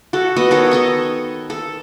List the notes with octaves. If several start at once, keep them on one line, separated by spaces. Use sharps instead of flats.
F#4 A4
B3 F#4 D#5
D#3 A4 C#5
A4 D#5 C#6
A4